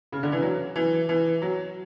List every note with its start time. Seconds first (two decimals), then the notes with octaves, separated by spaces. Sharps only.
0.12 C#3
0.23 D3
0.32 E3
0.42 F#3
0.76 E3
1.09 E3
1.42 F#3